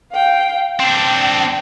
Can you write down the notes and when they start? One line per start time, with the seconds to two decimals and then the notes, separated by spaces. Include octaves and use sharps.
0.13 F5 G5
0.80 C4 D4 G5